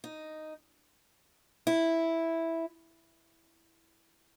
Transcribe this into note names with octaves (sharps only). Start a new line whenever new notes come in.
D#4
E4